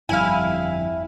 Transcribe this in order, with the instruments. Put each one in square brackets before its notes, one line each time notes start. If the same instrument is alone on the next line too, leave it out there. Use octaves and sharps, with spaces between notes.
[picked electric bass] G1 F2 G3 [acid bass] E4 [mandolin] F5 G#5